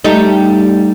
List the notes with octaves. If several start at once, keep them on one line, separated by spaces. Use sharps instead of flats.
G3 A3 D#4